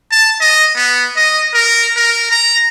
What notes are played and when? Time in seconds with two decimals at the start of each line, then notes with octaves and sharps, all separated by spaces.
0.11 A5
0.40 D#5
0.76 B3
1.16 D#5
1.54 A#4
1.96 A#4
2.31 A#5